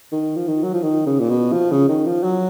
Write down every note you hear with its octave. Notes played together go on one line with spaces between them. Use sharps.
D#3
F3
D#3
F#3
F3
D#3
C#3
A#2
B2
F3
C#3
D#3
F3
F#3